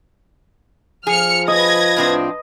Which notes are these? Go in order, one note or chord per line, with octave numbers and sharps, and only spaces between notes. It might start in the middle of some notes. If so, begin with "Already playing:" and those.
F3 G#4 F6 C#7
B4 D#5 G#6 A#6
A2 C4 D4